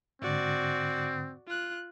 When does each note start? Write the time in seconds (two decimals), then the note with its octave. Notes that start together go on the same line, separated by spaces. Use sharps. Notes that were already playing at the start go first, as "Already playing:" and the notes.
0.22 G#2 D3 C4 F#4 D5
1.47 F4 F#6